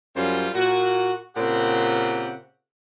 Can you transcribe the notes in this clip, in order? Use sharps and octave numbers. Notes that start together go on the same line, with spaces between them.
F#2 G3 C#4 F4 C5
A#2 F#4
A#2 C#3 C4 G4 F#5